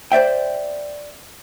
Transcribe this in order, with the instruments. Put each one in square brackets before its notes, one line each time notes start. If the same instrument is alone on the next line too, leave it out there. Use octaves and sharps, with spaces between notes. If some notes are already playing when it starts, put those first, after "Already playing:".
[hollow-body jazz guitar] C5 D5 E5 G5